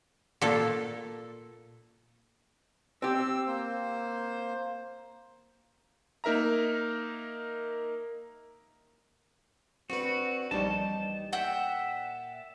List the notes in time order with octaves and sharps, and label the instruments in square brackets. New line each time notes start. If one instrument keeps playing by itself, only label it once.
[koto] A#2 A4
[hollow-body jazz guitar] C4 G4 [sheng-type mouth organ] E6
[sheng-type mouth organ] A#3 C5
[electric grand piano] A#3 D#4 A#4 E5 A#5
[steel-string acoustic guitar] C4 D4 B4 [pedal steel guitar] F#4
[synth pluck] A#1 G3 [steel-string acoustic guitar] E2 D#4 G4 [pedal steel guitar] A5
[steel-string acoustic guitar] A#2 [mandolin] E5 F#5 G5